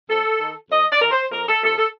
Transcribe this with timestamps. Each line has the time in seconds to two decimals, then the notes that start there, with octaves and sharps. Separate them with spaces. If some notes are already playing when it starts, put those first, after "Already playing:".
0.09 F2 A4
0.40 D#3
0.70 F2 D#5
0.90 D5
1.01 D#3 A#4
1.11 C5
1.31 F2 A#4
1.46 A4
1.62 C3 F3 A4
1.76 A4